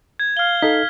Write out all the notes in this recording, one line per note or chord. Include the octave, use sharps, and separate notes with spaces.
G#6
F5 F6 G7
D#4 A4 B6